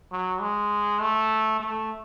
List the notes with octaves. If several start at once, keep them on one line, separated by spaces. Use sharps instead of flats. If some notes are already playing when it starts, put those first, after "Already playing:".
F#3
G#3
A3
A3